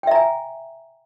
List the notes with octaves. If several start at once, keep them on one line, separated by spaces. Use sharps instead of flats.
E5 G5 G#5 A#5